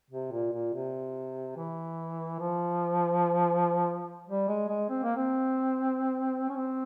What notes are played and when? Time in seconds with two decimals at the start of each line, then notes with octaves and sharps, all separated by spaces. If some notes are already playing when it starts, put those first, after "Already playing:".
0.10 C3
0.32 A#2
0.52 A#2
0.73 C3
1.56 E3
2.39 F3
4.27 G3
4.48 G#3
4.68 G#3
4.89 C4
5.03 A#3
5.16 C4
6.49 C#4
6.56 C4